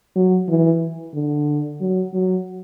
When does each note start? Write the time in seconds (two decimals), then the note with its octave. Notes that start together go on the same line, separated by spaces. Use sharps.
0.15 F#3
0.48 E3
1.14 D3
1.81 F#3
2.14 F#3